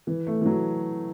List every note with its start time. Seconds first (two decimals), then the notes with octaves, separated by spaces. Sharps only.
0.07 E3
0.27 A3
0.41 E3
0.46 F#3